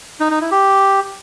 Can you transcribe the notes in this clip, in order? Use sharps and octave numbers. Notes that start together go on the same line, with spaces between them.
D#4
D#4
E4
G4